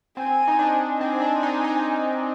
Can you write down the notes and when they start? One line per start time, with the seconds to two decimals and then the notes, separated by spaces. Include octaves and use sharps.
0.17 C4 G#5
0.48 D#4
0.59 D4
1.01 C4 G#5
1.21 D4
1.43 D#4
1.64 D#4